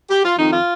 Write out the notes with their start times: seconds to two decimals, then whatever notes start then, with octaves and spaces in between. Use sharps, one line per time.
0.10 G4
0.24 F4
0.38 F2 D#3 D#4
0.51 F4